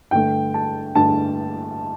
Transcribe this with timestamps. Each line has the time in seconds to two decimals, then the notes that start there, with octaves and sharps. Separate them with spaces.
0.11 G2 D3 A3 G5
0.54 A5
0.95 G2 D3 A3 A5